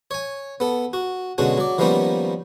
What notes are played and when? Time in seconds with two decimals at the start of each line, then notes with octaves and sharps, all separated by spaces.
0.11 C#5 G#5
0.60 B3 A4
0.93 F#4
1.38 B2 D3 G#3 C#4 F#4
1.58 F#3 D5
1.78 D#3 F3 G3 A#3 B3 C#4